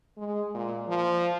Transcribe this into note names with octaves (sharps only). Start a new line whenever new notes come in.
G#3
A#2
F3